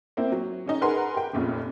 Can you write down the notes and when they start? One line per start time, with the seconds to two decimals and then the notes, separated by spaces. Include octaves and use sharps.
0.17 A#3 C4 E4
0.32 F#3
0.66 C#3 C#4 D#4
0.81 G#4 A#4 B4 F#5 C6
1.14 G4 G5
1.33 F1 A#2 C#3